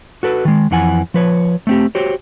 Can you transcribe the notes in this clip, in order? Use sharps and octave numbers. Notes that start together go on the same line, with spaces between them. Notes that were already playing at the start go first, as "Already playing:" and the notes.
F#4 A4 B4
D#3 G#3
F2 E3 F#5 G#5
F3 B4 C#5
A3 C4 G4
F#4 G4 C5 C#5